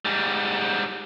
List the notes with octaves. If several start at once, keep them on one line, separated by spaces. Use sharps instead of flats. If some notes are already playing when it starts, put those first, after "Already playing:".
G#2 G3